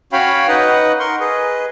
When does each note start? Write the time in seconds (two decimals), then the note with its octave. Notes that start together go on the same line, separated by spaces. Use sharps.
0.13 C#4 F#4 C#5 F5 G5 B5
0.48 D#4 B4 D#5 F#5
1.00 A#4 C6 C#6
1.20 G#4 B4 D#5